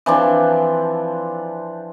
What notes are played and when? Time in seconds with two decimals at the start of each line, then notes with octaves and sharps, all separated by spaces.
0.06 E3 F3 C4 D4